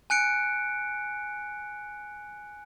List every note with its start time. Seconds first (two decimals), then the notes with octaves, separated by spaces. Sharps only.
0.10 G#5 F#6 C#7 D7